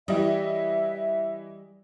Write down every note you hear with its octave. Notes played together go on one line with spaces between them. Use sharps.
E3 G3 E4 D#5 E5